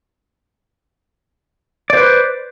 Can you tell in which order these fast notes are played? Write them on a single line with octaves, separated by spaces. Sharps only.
D5 C5 B4